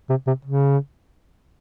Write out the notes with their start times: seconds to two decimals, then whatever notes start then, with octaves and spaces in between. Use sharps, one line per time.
0.09 C3
0.27 C3
0.45 C#3